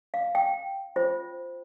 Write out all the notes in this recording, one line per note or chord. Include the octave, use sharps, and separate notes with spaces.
F5
G5
F4 C5